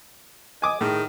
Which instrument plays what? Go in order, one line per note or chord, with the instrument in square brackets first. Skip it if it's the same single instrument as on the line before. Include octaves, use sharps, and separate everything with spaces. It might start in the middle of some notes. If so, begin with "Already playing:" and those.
[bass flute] D#5 [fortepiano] G#5 D6 D#6
[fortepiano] A2 [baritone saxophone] D#3 [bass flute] G#4